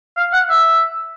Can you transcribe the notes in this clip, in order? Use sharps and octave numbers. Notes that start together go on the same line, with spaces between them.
F5
F#5
E5